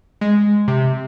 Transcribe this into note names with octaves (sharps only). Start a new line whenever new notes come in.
G#3
C3